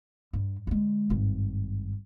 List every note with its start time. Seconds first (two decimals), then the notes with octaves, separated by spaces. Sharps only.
0.33 G2
0.67 D3 G#3
1.10 G#1 G2